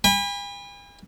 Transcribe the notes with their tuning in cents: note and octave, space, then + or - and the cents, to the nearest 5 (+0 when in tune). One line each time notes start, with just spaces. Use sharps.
G#5 -45 B5 -5